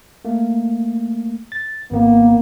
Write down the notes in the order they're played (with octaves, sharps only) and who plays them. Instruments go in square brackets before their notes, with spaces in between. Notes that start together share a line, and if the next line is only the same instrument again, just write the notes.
[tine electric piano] A3 A#3
A6
[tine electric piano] G#1 B3 [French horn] A#3